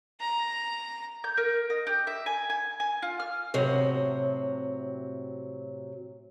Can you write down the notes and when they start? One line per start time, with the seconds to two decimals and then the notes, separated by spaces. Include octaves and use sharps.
0.20 A#5
1.24 G6
1.37 A#4
1.70 D#5
1.87 G4
2.07 E5
2.26 G#5
2.50 G#5
2.80 G#5
3.02 F4
3.20 F6
3.54 A2 C3 F#3